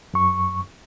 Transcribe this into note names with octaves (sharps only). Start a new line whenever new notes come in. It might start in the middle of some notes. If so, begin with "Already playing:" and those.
F#2 C#6